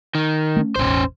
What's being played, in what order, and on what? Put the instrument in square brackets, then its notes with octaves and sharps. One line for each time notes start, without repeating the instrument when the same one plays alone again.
[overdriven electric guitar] D#3
[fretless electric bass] A3 C4 C#4
[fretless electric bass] E1 A1 [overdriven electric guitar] C#4 C5